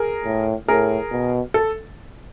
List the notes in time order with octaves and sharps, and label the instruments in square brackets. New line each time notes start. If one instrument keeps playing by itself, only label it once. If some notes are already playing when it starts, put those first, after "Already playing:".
Already playing: [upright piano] G#4 A#4
[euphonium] A2
[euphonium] A2 [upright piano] G#4 A#4
[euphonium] B2
[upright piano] A4